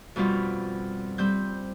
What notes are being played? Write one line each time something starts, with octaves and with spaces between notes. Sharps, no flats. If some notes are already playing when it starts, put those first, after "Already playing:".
F2 B2 G3 F4
G3 C4 G6